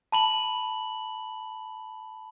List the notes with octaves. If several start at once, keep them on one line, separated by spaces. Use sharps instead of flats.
A5 B5 F#7